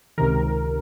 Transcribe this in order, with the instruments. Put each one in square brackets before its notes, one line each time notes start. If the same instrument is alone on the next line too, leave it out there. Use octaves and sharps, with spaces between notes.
[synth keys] C#2 C3 D#3 A#4